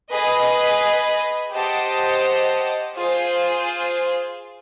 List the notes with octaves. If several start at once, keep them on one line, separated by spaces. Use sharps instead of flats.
G#4 B4 D#5
G4 C5 D#5 F#5 A5
F4 G#4 C5 F5